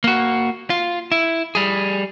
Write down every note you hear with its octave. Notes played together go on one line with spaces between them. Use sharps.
A#3 F#4
F4
E4
G3 G#4